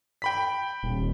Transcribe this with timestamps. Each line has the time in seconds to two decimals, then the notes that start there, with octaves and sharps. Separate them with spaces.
0.22 G5 B5 B6
0.83 D#1